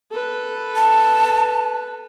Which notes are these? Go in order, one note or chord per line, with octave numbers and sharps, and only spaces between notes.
A4 B4
A5